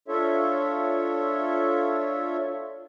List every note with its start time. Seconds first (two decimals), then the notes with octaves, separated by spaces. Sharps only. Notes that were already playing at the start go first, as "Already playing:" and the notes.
0.08 D4 F4 A4 C#5 E5